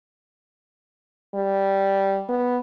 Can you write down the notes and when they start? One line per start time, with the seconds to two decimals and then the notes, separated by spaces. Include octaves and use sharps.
1.35 G3
2.29 B3